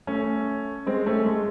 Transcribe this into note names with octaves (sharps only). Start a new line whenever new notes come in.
A3 C#4
G#3 C4
A3 C#4
G#3